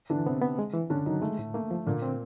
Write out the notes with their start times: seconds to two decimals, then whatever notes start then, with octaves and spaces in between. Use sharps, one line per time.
0.10 D3 E3 D4
0.26 C3 B3 C4
0.41 B3
0.59 G#3
0.74 E3
0.90 D3 C#4 D4
1.06 D#3 F#3 D#4
1.22 G#3 A3
1.39 A2
1.54 A3 A#3
1.71 F3
1.87 A#2 D3 A#3
2.02 C4